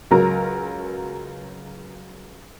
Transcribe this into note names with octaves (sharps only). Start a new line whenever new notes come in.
C#2 F#3 A#4 A#5